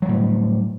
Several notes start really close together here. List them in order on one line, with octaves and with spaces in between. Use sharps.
F#3 G3 A2